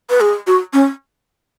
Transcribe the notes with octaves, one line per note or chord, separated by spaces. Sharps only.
B4
G#4
F#4
C#4